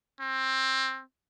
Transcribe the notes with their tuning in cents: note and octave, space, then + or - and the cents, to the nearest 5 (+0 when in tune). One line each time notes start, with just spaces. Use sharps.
C4 +15